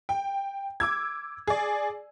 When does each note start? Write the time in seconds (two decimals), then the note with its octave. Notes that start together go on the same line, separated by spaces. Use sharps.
0.09 G5
0.80 D6 E6 G#6
1.47 G#4 D5